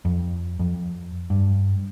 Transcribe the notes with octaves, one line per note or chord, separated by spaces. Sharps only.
F2
F2
G2